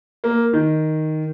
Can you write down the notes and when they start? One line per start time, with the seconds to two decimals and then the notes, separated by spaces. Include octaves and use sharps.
0.24 A#3
0.53 D#3